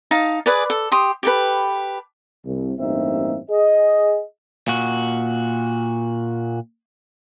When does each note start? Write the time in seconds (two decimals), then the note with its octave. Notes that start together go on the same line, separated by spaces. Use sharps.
0.11 D#4 F5 A5
0.46 G#4 B4 D5
0.70 A4
0.92 G4 C6 D#6
1.23 G4 A4 B4
2.46 C2
2.79 A1 G2 A#3 C4 D#4 E5
3.50 G#4 D#5
4.68 A#2 F#4